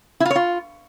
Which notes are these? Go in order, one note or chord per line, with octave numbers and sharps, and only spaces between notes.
E4
F4
C#5
F4